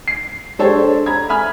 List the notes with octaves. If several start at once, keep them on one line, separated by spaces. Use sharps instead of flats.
C7
G#3 D4 G4 A4 C5 C#5
A#5 B5 G#6
E5 G#5 B5 F6